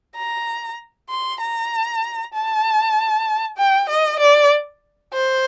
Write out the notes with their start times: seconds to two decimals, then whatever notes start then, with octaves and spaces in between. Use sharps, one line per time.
0.16 A#5
1.09 C6
1.41 A#5
2.34 A5
3.57 G5
3.89 D#5
4.20 D5
5.13 C5